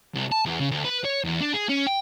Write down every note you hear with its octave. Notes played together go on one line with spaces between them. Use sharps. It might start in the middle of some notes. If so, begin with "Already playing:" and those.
C2
A5
E2
C#3
D2
B4
C#5
E2
D4
G#4
C#4
G5